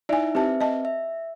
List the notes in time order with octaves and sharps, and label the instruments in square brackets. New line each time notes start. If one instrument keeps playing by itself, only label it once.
[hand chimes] D#4 E4 E5 [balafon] D5 G#5
[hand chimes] C4 B4 E5 [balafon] G4 A5
[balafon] D#5 A5
[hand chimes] E5